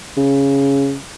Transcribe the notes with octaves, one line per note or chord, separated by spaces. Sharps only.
C#3